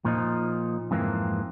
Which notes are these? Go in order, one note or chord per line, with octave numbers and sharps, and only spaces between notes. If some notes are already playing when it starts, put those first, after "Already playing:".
A#2 F3 D#4
F2 G#2 E3 A#3 C4